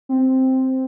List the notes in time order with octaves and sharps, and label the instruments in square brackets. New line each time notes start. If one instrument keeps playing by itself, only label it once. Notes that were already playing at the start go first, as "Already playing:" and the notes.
[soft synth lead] C4